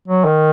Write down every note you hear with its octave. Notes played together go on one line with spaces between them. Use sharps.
F#3
D#3